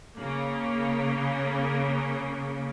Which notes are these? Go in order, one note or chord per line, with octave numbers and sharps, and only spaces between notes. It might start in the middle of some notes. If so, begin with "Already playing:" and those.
C#3 A#3